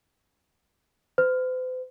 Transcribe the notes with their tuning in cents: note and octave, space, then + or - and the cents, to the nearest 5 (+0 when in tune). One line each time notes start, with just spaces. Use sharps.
C5 -45